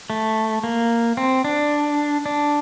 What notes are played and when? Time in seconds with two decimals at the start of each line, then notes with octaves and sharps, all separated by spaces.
0.10 A3
0.64 A#3
1.17 C4
1.44 D4
2.26 D4